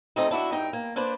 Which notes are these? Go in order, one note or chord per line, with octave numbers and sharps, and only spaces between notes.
D2 A3 C4 D#4 A4 D#5
D4 E4 F#4 E5
G2 D#4 G5
A#3
A#3 D4 B4 C5 D5